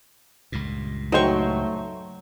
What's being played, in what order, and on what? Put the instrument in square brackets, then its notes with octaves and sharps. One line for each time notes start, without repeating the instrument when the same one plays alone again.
[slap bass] C#2 G2 A#2
[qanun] F#3 C#6 [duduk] A3 [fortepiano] D#4 C5 G5